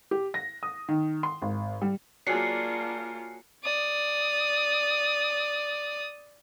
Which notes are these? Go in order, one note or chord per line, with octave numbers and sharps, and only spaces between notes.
G4
A#6
D#6
D#3
C6
G#1
G3
F#3 A#3 D4 F4 F#4 G#4 C7 C#7
D5 D#6